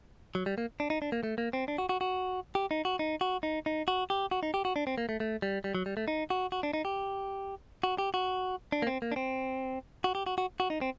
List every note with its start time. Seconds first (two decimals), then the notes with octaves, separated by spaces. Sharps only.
0.35 F#3
0.46 G3
0.58 A#3
0.80 D4
0.90 D#4
1.02 D4
1.12 A#3
1.23 A3
1.38 A#3
1.53 C4
1.68 D4
1.78 F#4
1.89 F#4
2.01 F#4
2.55 G4
2.71 D#4
2.85 F#4
2.99 D#4
3.21 F#4
3.43 D#4
3.66 D#4
3.88 F#4
4.10 G4
4.31 F#4
4.43 D#4
4.54 G4
4.65 F#4
4.76 D4
4.87 C4
4.98 A#3
5.09 A3
5.20 A3
5.42 G3
5.64 G3
5.75 F#3
5.86 G3
5.97 A3
6.08 D#4
6.30 F#4
6.52 F#4
6.63 D4
6.73 D#4
6.85 G4
7.83 F#4
7.98 G4
8.14 F#4
8.72 D4
8.82 A#3
8.87 C4
9.02 A#3
9.12 D4
9.16 C4
10.04 F#4
10.15 G4
10.26 F#4
10.38 F#4
10.60 F#4
10.70 D#4
10.81 C4